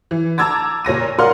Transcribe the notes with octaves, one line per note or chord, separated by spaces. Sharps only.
E3
A5 A#5 D6 E6 G#6 A6
A#2 C#5 A#6 D#7
A#4 D5 F5 F#5 C6 F6